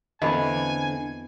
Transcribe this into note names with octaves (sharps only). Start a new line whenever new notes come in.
E2 D3 A#3 C4 D#5 G#5 A5 B5